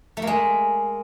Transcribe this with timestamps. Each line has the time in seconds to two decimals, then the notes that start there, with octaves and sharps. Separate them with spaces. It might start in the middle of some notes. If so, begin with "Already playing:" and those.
0.17 A3
0.22 A#3
0.27 G#3